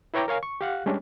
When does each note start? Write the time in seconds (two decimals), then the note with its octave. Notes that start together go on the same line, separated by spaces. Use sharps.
0.14 E4 B4 C#5 G5 A#5 D6
0.28 A#4 C#5 F5 G#5
0.43 C#6
0.61 G4 F5 F#5 F#6
0.86 G3 G#3 C#4 D4